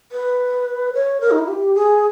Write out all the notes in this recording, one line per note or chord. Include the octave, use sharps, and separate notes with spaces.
B4
C#5
A#4
D#4
E4
G4
G#4